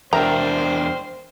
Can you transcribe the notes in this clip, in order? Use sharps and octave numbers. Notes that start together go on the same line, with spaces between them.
E2 D4 A#4 C5 E5 G5 A#5